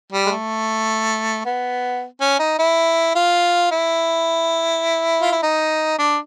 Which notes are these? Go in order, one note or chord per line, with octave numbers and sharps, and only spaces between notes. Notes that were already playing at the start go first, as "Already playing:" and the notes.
G3
G#3
A3
B3
C#4
D#4
E4
F4
E4
F4
E4
D#4
D4